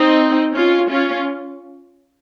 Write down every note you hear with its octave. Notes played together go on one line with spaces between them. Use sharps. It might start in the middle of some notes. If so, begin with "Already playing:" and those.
Already playing: C4 D#4
C#4 F4
C#4 F4